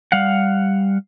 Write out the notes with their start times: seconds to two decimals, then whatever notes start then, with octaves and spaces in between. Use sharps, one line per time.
0.12 G3 F5 F#5